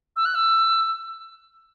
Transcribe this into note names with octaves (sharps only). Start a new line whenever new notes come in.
E6
F#6
E6